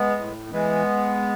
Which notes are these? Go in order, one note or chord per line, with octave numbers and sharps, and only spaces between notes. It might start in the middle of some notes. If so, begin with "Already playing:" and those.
Already playing: G#3 B3
A2
E3 G#3 B3